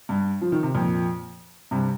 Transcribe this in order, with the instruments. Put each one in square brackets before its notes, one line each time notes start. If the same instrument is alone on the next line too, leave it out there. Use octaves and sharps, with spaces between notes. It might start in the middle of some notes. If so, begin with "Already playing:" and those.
[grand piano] G2
F3
D#3
C3
F2 A#2
G2 C3